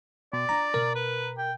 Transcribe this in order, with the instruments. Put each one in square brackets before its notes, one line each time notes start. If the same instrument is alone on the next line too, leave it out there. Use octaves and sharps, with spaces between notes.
[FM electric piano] B2 [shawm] D5
[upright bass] D4 F4 [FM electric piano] A#5
[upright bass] B2 [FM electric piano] A#4
[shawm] B4
G5